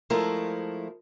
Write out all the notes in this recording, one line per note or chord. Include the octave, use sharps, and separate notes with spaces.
F3 G#3 A3 E4 A#4